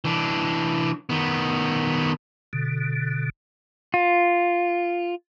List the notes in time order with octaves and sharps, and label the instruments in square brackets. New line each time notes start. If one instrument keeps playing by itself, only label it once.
[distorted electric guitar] E3 D4
D#3 B3
[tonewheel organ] B2 D3
[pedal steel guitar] F4